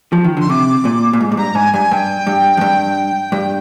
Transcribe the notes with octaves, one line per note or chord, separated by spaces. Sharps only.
F3
D#3
D3 C6
C3 D6
A#2
A#2
G#2
G#2
G2 A#5
G#2 G#5
G2 G#5
G2 G5
G2
F2
G2
G2